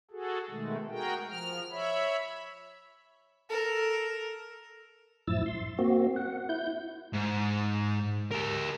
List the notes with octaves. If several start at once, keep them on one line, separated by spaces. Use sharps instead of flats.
F#4 G#4 A4
B2 D#3 G#3 A3
F#4 G#4 A#4 G5
F3 F6
C#5 E5 B5
A4 A#4
F#2 A2 F3 E4 E6 A6
C6
A#3 C4 F#4
F#5
E4 G6
G#2
G4 A#4